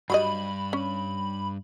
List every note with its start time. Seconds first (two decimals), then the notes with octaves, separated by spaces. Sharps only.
0.10 G2 F#3 G3 D#5 B5
0.73 C#4